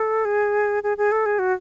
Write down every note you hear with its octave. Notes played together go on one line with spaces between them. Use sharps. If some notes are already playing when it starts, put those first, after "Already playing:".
Already playing: A4
G#4
G#4
G#4
A4
G#4
F#4